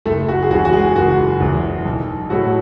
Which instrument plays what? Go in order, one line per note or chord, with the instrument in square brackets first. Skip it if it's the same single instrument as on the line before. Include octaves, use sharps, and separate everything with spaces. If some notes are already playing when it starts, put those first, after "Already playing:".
[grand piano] F#1 A3 A4
F#4
G#4
E2 C#3 E3 F#4
F#4
G#3 G#4
F#1 F#4
E2 C#3 E3
B1
A2 F#3 A3 F#4